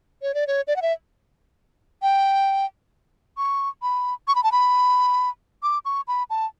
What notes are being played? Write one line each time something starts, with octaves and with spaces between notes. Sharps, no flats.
C#5
D5
C#5
D5
F#5
E5
G5
C#6
B5
C#6
B5
A5
B5
D6
C#6
B5
A5